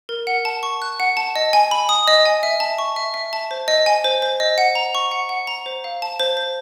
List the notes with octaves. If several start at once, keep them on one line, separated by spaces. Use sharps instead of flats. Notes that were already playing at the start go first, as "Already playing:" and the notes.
A#4
F#5
A5
C#6
F#6
F#5
A5
D#5
G#5
B5
D#6
D#5
G#5
E5
A5
C#6
E5
E5
A5
C5
D#5
G#5
C5
C5
D#5
F#5
A#5
C#6
F#5
F#5
A#5
C5
F5
A5
C5
C5